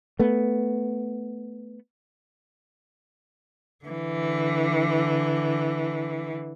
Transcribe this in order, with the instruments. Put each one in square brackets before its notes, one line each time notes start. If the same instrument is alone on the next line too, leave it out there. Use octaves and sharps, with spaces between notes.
[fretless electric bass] A3 B3
[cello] D3 E3